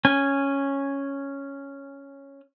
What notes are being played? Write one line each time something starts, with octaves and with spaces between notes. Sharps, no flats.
C#4 G#5